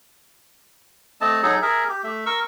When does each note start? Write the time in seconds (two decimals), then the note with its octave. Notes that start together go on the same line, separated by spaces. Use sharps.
1.21 A3 C4 D#5 A5
1.43 F#3 D#4 G#4 A4
1.62 G#4 A#4 E5
1.89 G4
2.04 A3 E5
2.26 A#4 C#6 E6